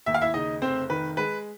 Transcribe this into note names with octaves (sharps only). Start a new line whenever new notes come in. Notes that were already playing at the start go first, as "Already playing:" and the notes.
D#2 E5
F5
E4 E5
C#3 D#4 D#5
F1 C4 C5
D#3 B4
G#3 B4